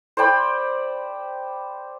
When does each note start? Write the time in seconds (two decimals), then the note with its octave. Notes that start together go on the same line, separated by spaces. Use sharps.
0.17 C5 D5 G5 B5